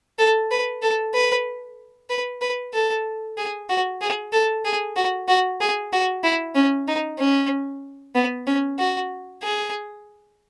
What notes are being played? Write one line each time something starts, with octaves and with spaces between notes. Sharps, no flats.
A4
B4
A4
B4
B4
B4
A4
G#4
F#4
G#4
A4
G#4
F#4
F#4
G#4
F#4
E4
C#4
D#4
C#4
B3
C#4
F#4
G#4